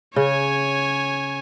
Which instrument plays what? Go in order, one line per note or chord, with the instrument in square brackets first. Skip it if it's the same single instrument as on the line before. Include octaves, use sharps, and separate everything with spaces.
[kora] C#3 [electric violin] C#5 G#5